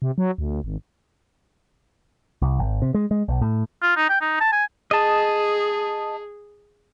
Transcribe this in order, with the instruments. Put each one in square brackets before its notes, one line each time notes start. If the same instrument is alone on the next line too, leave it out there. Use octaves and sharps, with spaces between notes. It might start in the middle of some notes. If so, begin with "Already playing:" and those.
[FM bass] C3
F#3
D2
G#1
[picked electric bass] C2
G#1
C3
G#3
G#3
B1
A2
[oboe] F4
D#4
G5
D#4
A5
G#5
[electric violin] G#4 [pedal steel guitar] D#5 A5